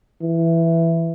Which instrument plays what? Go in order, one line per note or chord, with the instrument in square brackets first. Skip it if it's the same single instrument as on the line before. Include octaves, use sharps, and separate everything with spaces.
[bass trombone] E3